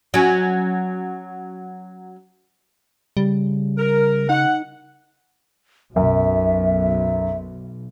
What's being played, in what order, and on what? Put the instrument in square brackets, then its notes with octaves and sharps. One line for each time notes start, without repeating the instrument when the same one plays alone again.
[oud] F#3 C#4
[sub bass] C#3 [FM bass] G3
[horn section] A#4
[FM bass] D#4 [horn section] F#5
[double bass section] B1 [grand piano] F#2 [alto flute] E5